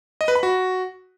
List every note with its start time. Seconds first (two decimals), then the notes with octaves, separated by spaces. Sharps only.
0.21 D#5
0.28 B4
0.35 B5
0.43 F#4